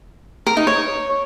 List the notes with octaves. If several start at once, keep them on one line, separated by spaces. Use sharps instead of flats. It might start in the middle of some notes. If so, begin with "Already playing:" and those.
A#4
D#4
C#5